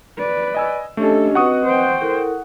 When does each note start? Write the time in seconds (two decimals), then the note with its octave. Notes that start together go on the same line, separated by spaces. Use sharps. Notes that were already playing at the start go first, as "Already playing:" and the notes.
0.17 B4 D5
0.55 D#5 G#5 E6
0.97 A3 C#4 D4 G4 A4 D#5
1.35 C4 F#4 B4 D#5 F#5 C#6 D#6
1.66 C5 G5
2.01 E4 A4 A#4